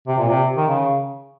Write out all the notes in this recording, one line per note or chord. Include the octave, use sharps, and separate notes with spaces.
C3
A#2
C3
D#3
C#3